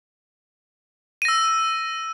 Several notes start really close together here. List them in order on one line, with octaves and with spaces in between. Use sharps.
D#7 A#6 E6